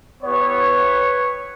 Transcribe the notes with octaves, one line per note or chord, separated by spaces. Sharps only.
B3 E4 G4 B4 C#5